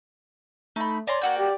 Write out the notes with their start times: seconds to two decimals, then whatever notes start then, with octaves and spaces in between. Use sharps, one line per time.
0.76 A3 D#4 B5
1.07 C#5 D5 G#5 A#5 C6
1.21 A#3 F#4 F#5 G5
1.38 G4